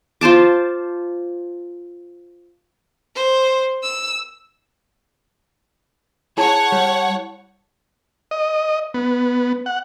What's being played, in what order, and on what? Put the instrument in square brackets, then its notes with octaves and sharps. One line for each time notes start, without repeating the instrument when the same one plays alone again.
[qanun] F4 C5 A5 D6
[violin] C5
E6
[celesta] E4 A5 [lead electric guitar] G#4 [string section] C#5 F#5
[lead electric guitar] G3
[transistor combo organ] D#5
B3
F#5